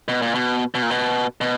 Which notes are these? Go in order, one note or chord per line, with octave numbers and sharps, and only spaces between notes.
B2
A#2
B2
B2
A#2
B2
B2